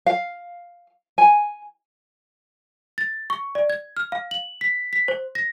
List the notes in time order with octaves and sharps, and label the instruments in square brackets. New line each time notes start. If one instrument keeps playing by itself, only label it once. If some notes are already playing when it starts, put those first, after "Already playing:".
[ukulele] F5
G#5
[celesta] A6
C#6
D5
G#6
F6
F5
F#7
B6
B6
C5
A#6